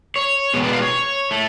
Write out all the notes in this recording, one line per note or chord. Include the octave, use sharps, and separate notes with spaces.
C#5
B2 G#3 B3
D5
F5
C#5
A3